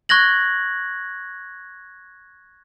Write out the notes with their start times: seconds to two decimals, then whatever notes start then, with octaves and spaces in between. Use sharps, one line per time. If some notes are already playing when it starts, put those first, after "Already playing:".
0.09 C#6 F#6 G#6 A#6 F#7